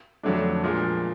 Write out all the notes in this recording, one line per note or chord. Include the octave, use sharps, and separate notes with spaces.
F2 D3 F#3 A3 D4
A#2 F3 G#3